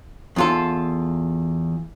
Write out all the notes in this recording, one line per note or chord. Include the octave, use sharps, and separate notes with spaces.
E2 F4 A4